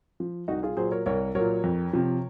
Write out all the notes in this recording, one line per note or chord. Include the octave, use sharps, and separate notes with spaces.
F3
C2 D#4 F#4
F4 G#4
A#2 F#3 G#4 C5
A#4 C#5
C2 A#4 C#5
A#2 F#3 A#4 C#5
F2
C3 F3